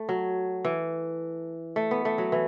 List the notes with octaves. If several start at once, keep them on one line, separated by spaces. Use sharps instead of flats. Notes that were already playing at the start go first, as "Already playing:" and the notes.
Already playing: A3
F#3
E3
A3
B3
A3
F#3
E3